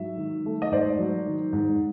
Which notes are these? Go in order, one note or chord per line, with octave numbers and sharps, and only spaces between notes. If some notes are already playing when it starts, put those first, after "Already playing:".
Already playing: G#2 F#3 E5
D#3
A3
D#5
G#2 C5 D5
F#3
D#3
G#2